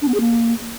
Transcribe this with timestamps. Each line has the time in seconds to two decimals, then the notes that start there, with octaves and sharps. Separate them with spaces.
0.01 D4
0.08 B3
0.14 G#4
0.20 A#3